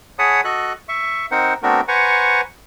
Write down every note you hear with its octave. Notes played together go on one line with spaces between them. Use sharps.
G#4 C#5 F#5 A5 B5 D#6
F#4 A4 D#5 F#6
E5 C#6
C4 D#4 A#4 C5 F#5
A3 B3 C4 D4 F#4 A#4
B4 C5 F#5 G#5 A#5 C#6